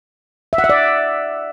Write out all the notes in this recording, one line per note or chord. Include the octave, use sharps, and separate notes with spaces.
E5
F#5
E5
D5